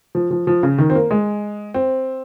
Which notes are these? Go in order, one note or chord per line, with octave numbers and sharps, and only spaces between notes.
F3
F3
F3
C#3
D#3
C4
A#3
G#3
C4